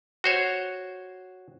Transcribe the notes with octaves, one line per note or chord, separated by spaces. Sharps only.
F#4 C5 C#5